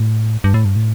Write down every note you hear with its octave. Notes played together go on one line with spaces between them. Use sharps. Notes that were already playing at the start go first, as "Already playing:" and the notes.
Already playing: A2
G2
A2
G2
A2